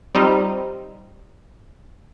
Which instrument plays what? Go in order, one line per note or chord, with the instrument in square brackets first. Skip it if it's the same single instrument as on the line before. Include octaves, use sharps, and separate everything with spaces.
[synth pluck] G3 C4 D#4 F4